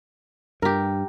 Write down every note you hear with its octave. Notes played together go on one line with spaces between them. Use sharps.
G2 G4 A#4